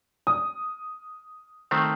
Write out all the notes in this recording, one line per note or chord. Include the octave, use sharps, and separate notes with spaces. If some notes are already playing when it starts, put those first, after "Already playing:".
D#6
D#3 A3 C4